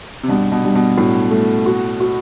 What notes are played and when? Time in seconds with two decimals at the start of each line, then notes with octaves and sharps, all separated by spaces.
0.23 C3
0.28 G2 B2
0.52 B2
0.64 G2
0.75 B2
0.97 A2 F#3
1.31 A3
1.66 F#4
2.00 F#4